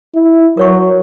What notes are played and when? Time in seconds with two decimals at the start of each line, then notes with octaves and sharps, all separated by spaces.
0.14 E4
0.57 F#3 A#4 C#5 C#6